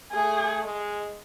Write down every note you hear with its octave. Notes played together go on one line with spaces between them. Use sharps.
A3 G#4
G#3